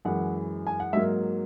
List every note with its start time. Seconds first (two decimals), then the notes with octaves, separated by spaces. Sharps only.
0.05 F#2 E3 G#3 F#5
0.67 G#5
0.80 F#5
0.93 G#2 F#3 A#3 E5